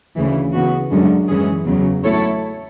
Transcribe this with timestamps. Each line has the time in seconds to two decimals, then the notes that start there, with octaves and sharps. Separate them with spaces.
0.15 D2 C#3 E3
0.53 C#3 E3 B3 F#4
0.90 F#2 D3 G#3 C#4
1.28 F#2 E3 G#3 C#4 G#4
1.66 E2 C#3 F#3
2.03 F#3 A3 E4 A4 C#5